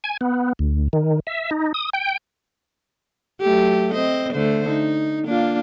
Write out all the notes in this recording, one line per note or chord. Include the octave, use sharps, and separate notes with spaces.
G#5
B3
D2
D#3
E5
D#4
D#6
G5
F#3 A3 G4
C4 C5 D#5
D3 A3 C5
D#4
A#3 D4 F4